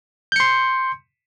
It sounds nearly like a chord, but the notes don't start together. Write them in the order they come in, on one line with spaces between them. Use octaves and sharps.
G6 C#7 C6